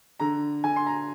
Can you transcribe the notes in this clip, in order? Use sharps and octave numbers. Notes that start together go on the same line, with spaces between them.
D3 A#5
D3 G#5
C6
A#5